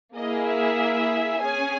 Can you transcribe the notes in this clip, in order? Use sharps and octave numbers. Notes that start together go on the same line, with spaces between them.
A#3 E4 G#4 D#5
E5
C#4 G#4 G#5